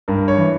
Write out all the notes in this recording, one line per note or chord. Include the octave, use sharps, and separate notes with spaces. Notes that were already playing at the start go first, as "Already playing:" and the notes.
G2 A#4
C#5
E3